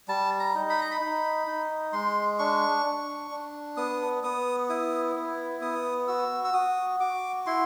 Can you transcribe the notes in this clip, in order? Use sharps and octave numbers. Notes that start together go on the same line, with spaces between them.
G3 A5
A#5
D#4
B5
A#5
B5
D#4
D#4
G#3 C6
D4 C#6
D4
D4
B3 D#6
B3 D#6
E4 D#6
B3
B3 D#6
F#4 E6
E6
F#4 D#6
F#4 D6
E4 C6